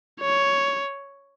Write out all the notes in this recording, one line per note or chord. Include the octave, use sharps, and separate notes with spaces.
C#5